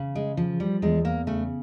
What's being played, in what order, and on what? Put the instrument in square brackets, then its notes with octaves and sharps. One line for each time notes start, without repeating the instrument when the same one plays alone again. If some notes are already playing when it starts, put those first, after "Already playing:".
Already playing: [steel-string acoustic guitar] C#3
G#3
F3
G3
E2 G#3
A#3
C#3 A3